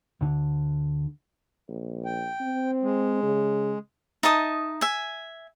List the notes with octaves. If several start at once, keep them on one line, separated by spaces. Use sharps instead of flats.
D2 D3
A#1
G5
C4
G#3
C#3
D#4 E5 A5 D#6
E5 G#5